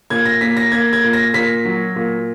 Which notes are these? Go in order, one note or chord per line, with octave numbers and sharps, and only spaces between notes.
A#2 G#6
A#6
A#3 B6
A#6
A#3 G#6
G#6
A#2
A#6
A#2 B6
F#3
A#2